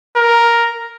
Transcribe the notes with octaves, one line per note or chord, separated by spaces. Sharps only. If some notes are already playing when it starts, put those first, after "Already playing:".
A#4